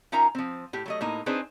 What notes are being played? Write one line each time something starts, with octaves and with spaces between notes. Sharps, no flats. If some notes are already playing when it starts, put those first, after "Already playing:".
C#4 D#4 F4 A#4 E5 A#5
F3 C4
A2 G4
F#3 A3 D#5
A2 A#3 D#4
C4 D4 D#4 G#4 B4 C5